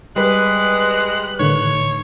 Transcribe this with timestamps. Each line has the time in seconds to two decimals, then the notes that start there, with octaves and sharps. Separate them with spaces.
0.16 G3 G#3 B4 F#6
1.40 A2 D3 D#3 C#5